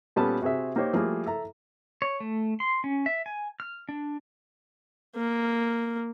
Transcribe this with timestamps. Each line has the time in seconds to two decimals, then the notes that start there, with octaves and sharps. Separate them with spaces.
0.16 A#2 G3 B3 C#4 A4 A5
0.42 C3 F#4 G#4 C5 E5
0.76 A#3 D#4 G4 A#4 C5 C#5
0.93 F3 G3 A3 A#3 G#4 A4
1.26 A4 E5 A#5
2.02 C#5
2.20 A3
2.60 C6
2.84 C#4
3.06 E5
3.26 G#5
3.60 F6
3.89 D4
5.16 A#3